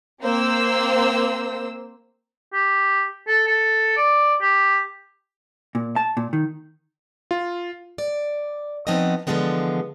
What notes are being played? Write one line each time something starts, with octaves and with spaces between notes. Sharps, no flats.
A#3 C4 C5 E6
G4
A4
A4
D5
G4
A#2
A5
A#2
D#3
F4
D5
F3 B3 C4 D#4 F#4 D#5
D3 E3 F3 G#3 B3 C4